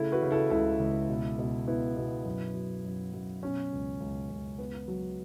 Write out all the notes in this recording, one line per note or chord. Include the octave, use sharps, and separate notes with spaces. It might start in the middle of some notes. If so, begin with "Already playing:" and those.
Already playing: C#3 A3 E4 A4
F#4 B4
C#3
E4 A4
C#2 E4 A4
C#2
B2
B2
B3 E4
B2
F#2
F#3
F#2
F#2
B2 C#4
C#2
C#2
C#2
B3
F#3